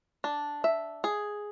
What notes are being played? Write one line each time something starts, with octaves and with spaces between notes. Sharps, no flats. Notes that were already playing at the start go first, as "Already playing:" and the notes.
D4
E5
G#4